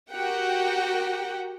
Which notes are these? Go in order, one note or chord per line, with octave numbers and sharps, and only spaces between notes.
F#4 G4 A#4 F#5 G5